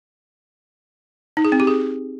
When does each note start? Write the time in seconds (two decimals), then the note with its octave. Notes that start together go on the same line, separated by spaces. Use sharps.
1.37 D#4
1.45 G#4
1.52 C4
1.60 G4
1.67 G#4